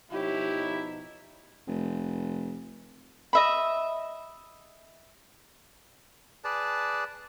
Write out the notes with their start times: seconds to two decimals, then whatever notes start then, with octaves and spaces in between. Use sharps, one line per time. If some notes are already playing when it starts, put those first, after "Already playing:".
0.11 B2 F3 D#4 E4 G4 C#5
1.67 F1
3.33 D#5 E5 B5
6.44 G#4 B4 D5 A5